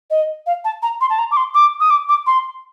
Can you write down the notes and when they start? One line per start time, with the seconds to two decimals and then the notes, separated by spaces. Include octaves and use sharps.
0.10 D#5
0.47 F5
0.65 A5
0.83 A#5
1.01 C6
1.10 A5
1.19 A#5
1.31 D6
1.37 C6
1.55 D6
1.80 D#6
1.90 D6
2.09 D6
2.27 C6